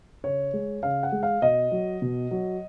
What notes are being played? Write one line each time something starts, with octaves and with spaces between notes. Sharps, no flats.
C#3 C#5
G#3
C#3 F5
F#5
G#3
F5
B2 D#5
F#3
B2
F#3